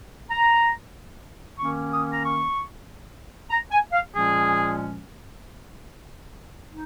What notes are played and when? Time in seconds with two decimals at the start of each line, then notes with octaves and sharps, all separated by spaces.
0.30 A#5
1.58 D#3 A#3 C#4 C#6
1.90 D#6
2.11 A#5
2.22 C#6
3.50 A#5
3.71 G#5
3.92 F5
4.14 A#2 F3 G#3 C#4 G#4
6.69 D#4